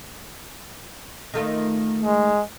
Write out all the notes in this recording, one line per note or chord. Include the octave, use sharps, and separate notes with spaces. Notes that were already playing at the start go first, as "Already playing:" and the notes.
D#3 A3 F4
G#3